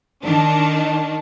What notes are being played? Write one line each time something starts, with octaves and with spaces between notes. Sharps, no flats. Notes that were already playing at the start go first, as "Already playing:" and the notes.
D#3 D4